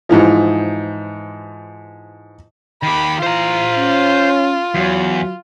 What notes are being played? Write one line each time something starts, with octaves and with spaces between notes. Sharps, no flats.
G#2 E3 F3
D#3 G4 B5
E3 F4 C5 A#5
C#4
E2 F#3